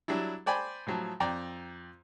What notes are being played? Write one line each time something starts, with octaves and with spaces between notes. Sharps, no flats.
F#3 G3 D4 E4
C5 D5 G5 G#5 B5
A2 F3 F#3
F2 D5 G5 A#5